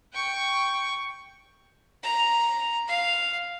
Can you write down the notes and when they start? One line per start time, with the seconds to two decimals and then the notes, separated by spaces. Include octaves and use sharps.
0.13 G5 C#6
2.03 A#5
2.88 F5